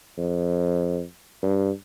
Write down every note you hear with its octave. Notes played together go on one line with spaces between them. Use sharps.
F2
G2